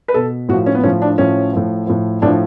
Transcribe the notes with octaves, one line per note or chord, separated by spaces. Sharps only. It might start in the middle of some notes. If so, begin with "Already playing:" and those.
B4
B2 A4
A2 F3 F#4
C#4
B3
A2 F3 C#4
D4
A2 F3 C#4
A2 F3
A2 F3
A2 F3 D4